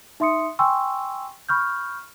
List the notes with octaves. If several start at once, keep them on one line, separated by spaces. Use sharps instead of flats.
D#4 E5 C6 D#6 C#7
G5 G#5 C6 C#6 E6
B5 C#6 F6 G6